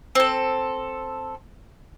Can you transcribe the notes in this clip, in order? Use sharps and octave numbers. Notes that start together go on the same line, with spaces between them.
C4 A4